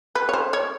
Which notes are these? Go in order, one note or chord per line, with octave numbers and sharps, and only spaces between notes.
B4
C#5
C5
C#5